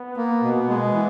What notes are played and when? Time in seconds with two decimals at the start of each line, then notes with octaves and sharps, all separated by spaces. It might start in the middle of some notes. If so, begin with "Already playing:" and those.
Already playing: B3
0.17 A#3
0.43 B2
0.68 G#3
0.94 E3